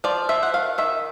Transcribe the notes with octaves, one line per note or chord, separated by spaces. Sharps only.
F3 D5
F3 E5
F#5
D#3 F5
D#3 E5